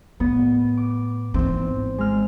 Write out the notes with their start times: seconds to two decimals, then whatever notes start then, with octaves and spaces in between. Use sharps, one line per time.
0.20 A2 B3
0.77 D6
1.34 G#1 E3 C4
1.98 G#3 F6